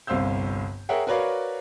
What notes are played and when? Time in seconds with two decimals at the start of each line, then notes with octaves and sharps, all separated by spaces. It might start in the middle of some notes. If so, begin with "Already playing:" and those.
0.07 G1 C2 C5 F5 E6 G6
0.89 G#4 A#4 C#5 E5 F#5 G5
1.07 F#4 A#4 B4 C#5 D5 F5